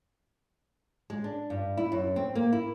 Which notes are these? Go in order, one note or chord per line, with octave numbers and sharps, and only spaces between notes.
G#3
D4
G2
E4
F#2
C4
A#3
E4